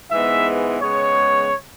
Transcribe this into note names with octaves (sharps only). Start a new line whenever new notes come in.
G#2 E3 G#3 B3 E5
C#3 G#3 B3 C#5